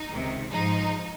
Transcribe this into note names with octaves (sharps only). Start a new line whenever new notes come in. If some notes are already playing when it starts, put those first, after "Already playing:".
Already playing: D#4
C#2 C3 D#3
G#2 F3 G#3 D#4